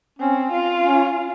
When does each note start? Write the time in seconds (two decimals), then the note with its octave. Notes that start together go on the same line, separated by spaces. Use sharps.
0.19 C4 C#4
0.51 F4
0.85 C#4